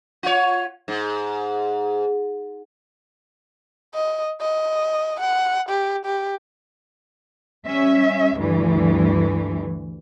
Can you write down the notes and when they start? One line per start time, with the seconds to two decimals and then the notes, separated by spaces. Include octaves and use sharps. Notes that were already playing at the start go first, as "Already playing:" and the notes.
0.23 F4 C#5
0.88 G#2
3.94 D#5
4.41 D#5
5.20 F#5
5.69 G4
6.05 G4
7.66 G3 C#4 E5
8.38 D2 G2 E3